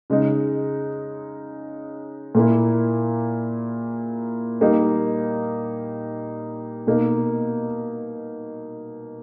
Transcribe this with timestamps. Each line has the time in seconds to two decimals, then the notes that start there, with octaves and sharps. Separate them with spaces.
0.10 C#3 G#3 D#4
2.35 A#2 A#3 E4
4.61 G3 A#3 D#4
6.87 B2 A#3 D#4